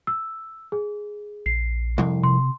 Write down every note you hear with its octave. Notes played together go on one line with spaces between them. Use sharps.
E6
G#4
A#1 C7
C2 F2
C3 C6